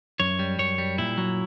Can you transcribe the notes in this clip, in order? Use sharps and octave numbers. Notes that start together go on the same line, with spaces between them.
F#2 C#5
G3
F#2 C#5
G3
A#2 E4
F#3